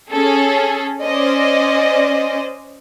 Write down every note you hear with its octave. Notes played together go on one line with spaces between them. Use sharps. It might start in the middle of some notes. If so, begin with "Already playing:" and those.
C#4 G#4 A4
C#4 C5 D5 D#5